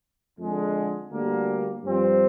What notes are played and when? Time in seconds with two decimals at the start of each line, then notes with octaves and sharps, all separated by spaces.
0.38 F2 D3 G#3
1.10 D2 D3 G3 A#3
1.83 G2 F3 C4